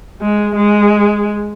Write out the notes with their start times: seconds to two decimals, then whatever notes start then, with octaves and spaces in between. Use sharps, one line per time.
0.21 G#3
0.56 G#3